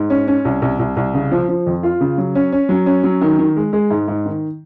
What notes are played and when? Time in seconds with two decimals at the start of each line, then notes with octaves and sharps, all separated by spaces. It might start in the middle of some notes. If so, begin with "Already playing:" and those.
Already playing: G#2
0.10 C#4
0.27 C#4
0.45 C2
0.62 C2
0.79 C2
0.97 C2
1.14 C#3
1.32 F3
1.49 F3
1.66 F2
1.83 F4
2.01 C#3
2.18 F#3
2.35 C#4
2.52 C#4
2.69 F#3
2.86 C#4
3.04 F#3
3.21 D#3
3.39 D#3
3.56 G#3
3.73 G#3
3.90 G#2
4.08 G#2
4.26 D#3